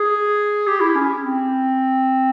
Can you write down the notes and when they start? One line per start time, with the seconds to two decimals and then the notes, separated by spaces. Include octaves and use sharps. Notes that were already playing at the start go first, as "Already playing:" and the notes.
Already playing: G#4
0.67 G4
0.80 E4
0.95 C#4
1.23 C4